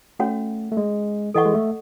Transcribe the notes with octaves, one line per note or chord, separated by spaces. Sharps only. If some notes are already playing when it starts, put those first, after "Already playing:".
A3 C#4 F#4 C#5 F#5
A3
G#3
E3 A4 D#5 F#5 C#6
G#3
A3